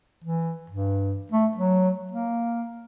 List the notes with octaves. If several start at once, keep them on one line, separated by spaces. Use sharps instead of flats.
E3
G2
A3
F#3
A#3